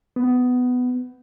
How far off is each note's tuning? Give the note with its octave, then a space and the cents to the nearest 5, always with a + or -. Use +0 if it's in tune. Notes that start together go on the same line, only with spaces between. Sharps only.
B3 +15